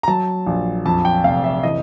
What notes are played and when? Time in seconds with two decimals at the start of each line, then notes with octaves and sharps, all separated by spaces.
0.03 A#5
0.08 F#3 A5
0.46 A#1
0.85 F2 A5
1.05 G5
1.24 F1 F5
1.44 E5
1.63 E3 D#5